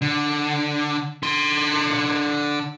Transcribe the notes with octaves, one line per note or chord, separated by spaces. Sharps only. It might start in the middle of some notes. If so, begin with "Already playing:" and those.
D3
D3 C6